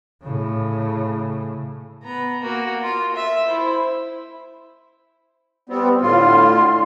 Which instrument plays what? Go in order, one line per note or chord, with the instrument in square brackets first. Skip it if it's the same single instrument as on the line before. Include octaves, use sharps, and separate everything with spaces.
[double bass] A2 C#3
[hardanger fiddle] B3 A#5
A#3 F#4
F4
E5
E4 C5
[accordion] G3 B3 C4
[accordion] A2 D3 F4 [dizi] C6